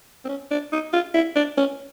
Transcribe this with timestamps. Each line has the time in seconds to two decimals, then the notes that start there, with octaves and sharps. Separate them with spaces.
0.25 C4
0.29 C#4
0.51 D4
0.72 D#4
0.93 F4
1.14 E4
1.36 D4
1.58 C#4